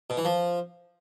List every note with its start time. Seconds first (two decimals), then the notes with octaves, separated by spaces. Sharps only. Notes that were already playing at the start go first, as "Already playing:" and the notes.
0.10 B2
0.17 E3
0.25 F3